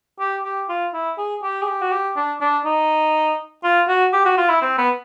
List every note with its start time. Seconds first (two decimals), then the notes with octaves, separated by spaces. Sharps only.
0.20 G4
0.44 G4
0.69 F4
0.94 E4
1.18 G#4
1.43 G4
1.62 G#4
1.67 G4
1.81 F#4
1.92 G4
2.16 D4
2.41 D4
2.65 D#4
3.64 F4
3.88 F#4
4.13 G4
4.25 F#4
4.38 F4
4.49 E4
4.62 C4
4.78 B3